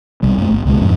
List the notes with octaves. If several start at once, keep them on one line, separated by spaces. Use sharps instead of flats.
B1 C3 G3
F#2 A3
G1
C#2 B2 G#3
F2 G#2